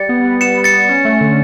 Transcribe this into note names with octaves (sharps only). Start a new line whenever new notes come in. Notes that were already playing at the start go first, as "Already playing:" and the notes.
Already playing: G3 A6 C#7
B3
B3
B3 C#7 E7
B3
A6 C#7
B3
C#4
A3
D3